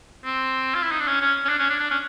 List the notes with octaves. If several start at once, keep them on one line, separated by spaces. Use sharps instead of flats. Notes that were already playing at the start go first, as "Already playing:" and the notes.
C4
F4
E4
D#4
D4
C#4
C#4
C#4
D4
C#4
D4
D4
C#4